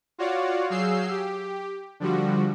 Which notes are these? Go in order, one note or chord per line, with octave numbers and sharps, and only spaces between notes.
F4 F#4 C#5 D5 F5 F#5
F#3 G#4 F5 E6 G6 C7
G4
D3 F3 G3 F#4